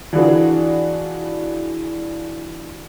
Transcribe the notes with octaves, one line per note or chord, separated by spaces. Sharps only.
E3 D4 F4 F#4 G#4 B4